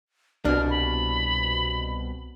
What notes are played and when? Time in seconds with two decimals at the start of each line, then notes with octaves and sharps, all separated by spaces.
0.45 C2 B2 D4 F6
0.70 B5